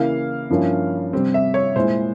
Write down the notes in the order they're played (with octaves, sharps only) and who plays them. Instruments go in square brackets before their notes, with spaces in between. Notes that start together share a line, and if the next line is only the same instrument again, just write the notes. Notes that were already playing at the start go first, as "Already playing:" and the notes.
Already playing: [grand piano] C#3 E3 A#3 E4 F5
G2 F3 A#3 C#4 E4
C3 G3 C4
E5
C#5
A#2 G#3 E4 C5